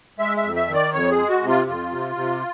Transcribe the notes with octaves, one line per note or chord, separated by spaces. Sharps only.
G#3 E5
E5
F2
E5
D#3
D5
F2 C#5
G#4
G#3
F#4
C3
F4
F2 F4
C3
C3